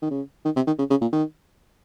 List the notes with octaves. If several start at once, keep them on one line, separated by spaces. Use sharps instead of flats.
D#3
C#3
D#3
C3
D#3
C#3
C#3
A#2
D#3